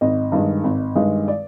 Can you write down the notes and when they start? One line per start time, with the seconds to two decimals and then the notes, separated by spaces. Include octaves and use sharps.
0.01 G#1 D#5
0.32 G2 D#3 G#3
0.64 G#1
0.95 G2 D#3 G#3
1.28 D5